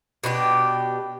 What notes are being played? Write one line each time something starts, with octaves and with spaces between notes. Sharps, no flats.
B2 D4 F#4 G4